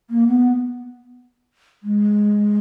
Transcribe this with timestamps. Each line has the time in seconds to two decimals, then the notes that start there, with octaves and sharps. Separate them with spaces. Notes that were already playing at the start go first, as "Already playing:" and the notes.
0.10 A#3
0.28 B3
1.83 G#3